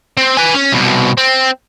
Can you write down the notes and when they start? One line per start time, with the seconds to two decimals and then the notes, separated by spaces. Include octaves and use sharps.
0.17 C4
0.37 B4 G#5
0.54 C#4
0.72 C2 B2
1.17 C4